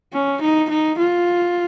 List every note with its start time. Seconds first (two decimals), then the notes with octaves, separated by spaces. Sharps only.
0.13 C#4
0.41 D#4
0.69 D#4
0.98 F4